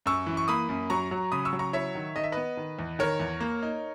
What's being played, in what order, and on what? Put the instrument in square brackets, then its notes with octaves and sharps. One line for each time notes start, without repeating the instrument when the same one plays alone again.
[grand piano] F#2 C#6 E6
E3
C#6
A#3 B5 D#6
F#2
F#3 A#5 C#6
F#3
C#3 B5 D#6
C#6 E6
F#3
A#5 C#6
E4 C#5 E5
D#3
D#3 D#5
E5
B3 B4 D#5
D#3
E2
D#3 A#4 C#5
E2
A#3
D#4